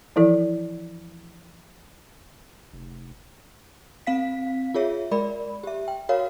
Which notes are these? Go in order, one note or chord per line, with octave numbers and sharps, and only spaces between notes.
E3 F3 E4 A4 D5
F1
C4 F5 B6
F4 G#4 C#5 E5
G#3 A#4 D5 B5
G4 E5
G5
F#4 A#4 C#5 F5